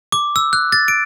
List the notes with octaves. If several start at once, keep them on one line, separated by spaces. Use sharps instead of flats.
D6
E6
F#6
A6
D7